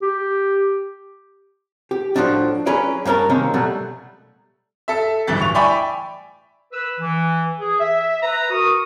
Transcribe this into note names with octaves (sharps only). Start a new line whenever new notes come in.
G4
G4
A2 C3 F3 F#3 D4
F#3 C#4 G#4 B4 D5
G2 A#3 C#4 A#4 A5
C3 D#3 G#3 A#3 C#4
B2 F#3 G3 A3
A4 E5
D1 G2 E3 A6
C#6 F7
D5 E5 G5 G#5 B5 C#6
B4 E6
E3
G#4
E5
B4 A#5
F#4 A#4 C#6 D#6